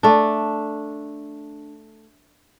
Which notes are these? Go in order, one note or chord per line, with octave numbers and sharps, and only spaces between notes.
A3 D4